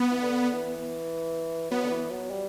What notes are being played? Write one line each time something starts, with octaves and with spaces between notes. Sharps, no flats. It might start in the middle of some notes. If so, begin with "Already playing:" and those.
Already playing: B3
E3
D3
E3
F#3 B3
D3
E3
F#3
G3